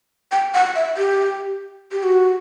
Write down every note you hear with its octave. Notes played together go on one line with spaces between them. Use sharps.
G5
F#5
E5
G4
G4
F#4